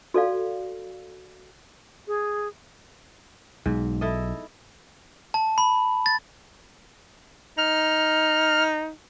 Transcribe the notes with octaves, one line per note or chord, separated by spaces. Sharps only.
F#4 A4 D5 F5
G#4
B1 G#2
E4 A4 D#5
A5
B5
A6
D#4 F6